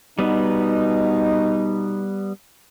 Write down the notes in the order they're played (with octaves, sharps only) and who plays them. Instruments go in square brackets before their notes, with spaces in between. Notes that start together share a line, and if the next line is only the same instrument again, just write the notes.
[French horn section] B2 D#4 [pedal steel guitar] G3 B3